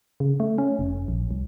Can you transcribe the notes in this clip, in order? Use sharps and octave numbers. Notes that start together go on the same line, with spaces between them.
C#3
A3
C#4
F1
A#1
C2